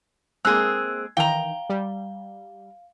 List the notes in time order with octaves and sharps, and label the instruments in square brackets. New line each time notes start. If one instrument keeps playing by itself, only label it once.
[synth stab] G#3 A#3 [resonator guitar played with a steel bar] C4 G#4 [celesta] E6 F#6
[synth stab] D#3 E3 [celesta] F5 G7 [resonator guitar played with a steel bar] G5 A#5
[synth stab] G3